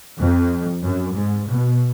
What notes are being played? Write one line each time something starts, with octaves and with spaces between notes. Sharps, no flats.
F2
F#2
G#2
B2